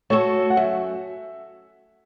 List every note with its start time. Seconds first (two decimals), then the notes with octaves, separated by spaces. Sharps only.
0.10 A3 F#4 A4 C#5
0.50 F#5
0.57 F#2 E5